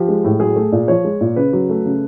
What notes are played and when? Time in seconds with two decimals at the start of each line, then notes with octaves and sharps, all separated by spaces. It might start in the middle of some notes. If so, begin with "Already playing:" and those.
Already playing: F3 G4
0.08 G#3
0.25 A2
0.40 F#3 G#4
0.56 A3
0.72 A#2
0.88 F3 C#5
1.04 G#3
1.21 A#2
1.36 C#3 B4
1.53 F#3
1.70 A3
1.85 C#3